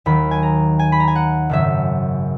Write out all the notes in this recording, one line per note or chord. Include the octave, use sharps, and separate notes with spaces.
D#2 D#3 F#3 B5
G#5
A#5
G#5
B5
A#5
G#5
F#5
G#1 F#2 C#3 F#3 E5